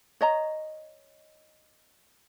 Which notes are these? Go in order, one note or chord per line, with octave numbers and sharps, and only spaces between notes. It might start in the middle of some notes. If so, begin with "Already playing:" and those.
C#5 D#5 A#5